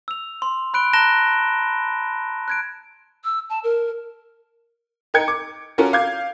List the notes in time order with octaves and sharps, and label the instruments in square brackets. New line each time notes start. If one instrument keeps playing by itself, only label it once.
[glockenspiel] E6 F7
C6
B5 F#6 D7 G7
A5 A#5 F#6 A#6 E7 G7
F#6 G#6 D7
[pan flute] E6
A5
A#4
[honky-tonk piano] D#4 A#4 G5 G#6 C#7
D6
C#4 F4 F#4 A4 A#4
F5 D6 G6 G#6